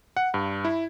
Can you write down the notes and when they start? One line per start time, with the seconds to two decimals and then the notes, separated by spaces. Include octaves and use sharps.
0.17 F#5
0.34 G2
0.65 E4